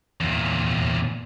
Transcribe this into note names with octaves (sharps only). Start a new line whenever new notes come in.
E2 A#2